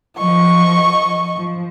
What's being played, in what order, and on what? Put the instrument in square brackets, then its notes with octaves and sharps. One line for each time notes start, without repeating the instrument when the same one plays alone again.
[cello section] F3 [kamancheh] D#5 C#6
[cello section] F3